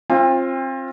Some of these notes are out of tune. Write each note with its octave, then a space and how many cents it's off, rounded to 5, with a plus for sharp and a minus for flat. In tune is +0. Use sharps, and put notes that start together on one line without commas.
C4 +30 F4 +0 G5 +40